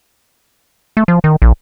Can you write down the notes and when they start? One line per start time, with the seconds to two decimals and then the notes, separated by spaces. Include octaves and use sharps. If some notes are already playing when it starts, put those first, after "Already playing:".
0.97 A3
1.08 F3
1.24 D#3
1.42 A#1